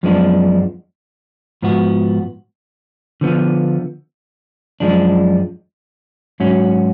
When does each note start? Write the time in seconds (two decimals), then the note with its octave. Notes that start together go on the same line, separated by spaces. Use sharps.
0.03 F#2 F3 G#3 B3 D4
1.62 G#2 F3 B3 F#4
3.21 D3 F3 B3
4.80 F#2 F3 G#3 D4
6.40 G#2 F#3 C#4 F#4